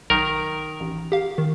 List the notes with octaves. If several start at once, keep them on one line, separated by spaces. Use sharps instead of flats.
B1 D#3 A#4
A1
G4 F5
D#3